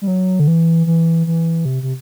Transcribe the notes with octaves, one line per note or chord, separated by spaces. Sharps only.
G3
F#3
D3
E3
E3
E3
C3
C3